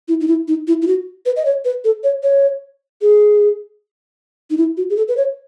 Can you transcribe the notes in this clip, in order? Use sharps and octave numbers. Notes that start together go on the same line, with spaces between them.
E4
D#4
E4
D#4
E4
E4
F#4
B4
D#5
C#5
B4
A4
C#5
C#5
G#4
D#4
E4
F#4
G#4
A4
B4
C#5